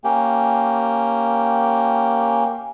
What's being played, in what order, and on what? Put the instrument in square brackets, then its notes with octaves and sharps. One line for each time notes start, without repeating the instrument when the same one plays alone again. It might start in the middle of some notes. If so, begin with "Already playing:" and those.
[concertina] A#3 C#4 G4